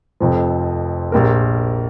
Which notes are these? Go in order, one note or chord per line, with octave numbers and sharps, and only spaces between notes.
F1 F2 F3
A#1 A#2 A#3 G4 A#4